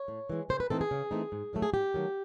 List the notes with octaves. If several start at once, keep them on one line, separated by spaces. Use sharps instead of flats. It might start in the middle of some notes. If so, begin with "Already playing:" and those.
Already playing: C#5
A2
E3 G#3
C#3 C5
B4
E3 A3 C4 D#4 A4
G#4
C#3
E3 A3 C4 D#4
G#2
D#3 F#3 A3
G#4
G#2 G4
D#3 F#3 A3